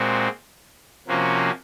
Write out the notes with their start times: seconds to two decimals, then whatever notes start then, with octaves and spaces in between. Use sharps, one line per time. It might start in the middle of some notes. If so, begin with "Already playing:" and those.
Already playing: A#2 G#3 C4 F#4
1.08 C3 F3 A#3 C#4 F#4